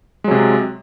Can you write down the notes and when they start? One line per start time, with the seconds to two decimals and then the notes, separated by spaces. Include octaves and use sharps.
0.24 G#3
0.28 F#3
0.31 C3